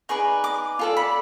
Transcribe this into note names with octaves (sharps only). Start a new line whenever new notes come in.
D#4 G#4 B4 D5 C#6
D6
F4 A4 D5
B5